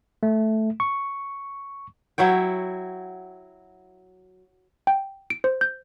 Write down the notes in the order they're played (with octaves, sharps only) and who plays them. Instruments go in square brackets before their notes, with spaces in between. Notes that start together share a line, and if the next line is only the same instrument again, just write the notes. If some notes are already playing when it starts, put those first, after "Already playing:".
[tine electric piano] A3
C#6
[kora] F#3 E4 C#5 G5
[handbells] G5
D7
C5
G6